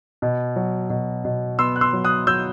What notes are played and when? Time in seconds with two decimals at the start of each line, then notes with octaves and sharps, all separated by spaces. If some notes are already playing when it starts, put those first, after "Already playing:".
0.22 B2
0.56 F#3
0.90 B2
1.25 B2
1.59 B3 C6 E6
1.76 F#6
1.81 C6 E6
1.93 F#3
2.04 D#6 F#6
2.27 F#3 E6 G6